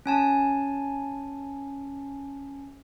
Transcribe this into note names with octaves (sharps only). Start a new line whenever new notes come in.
C#4 G#5 A5